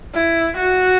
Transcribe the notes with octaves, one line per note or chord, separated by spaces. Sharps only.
E4
F#4